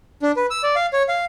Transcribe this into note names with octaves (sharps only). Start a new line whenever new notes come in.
D4
B4
E6
D5
F5
C#5
F5